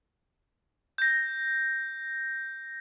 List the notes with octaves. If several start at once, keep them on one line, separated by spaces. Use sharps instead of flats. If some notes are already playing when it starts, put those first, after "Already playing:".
G6 A#6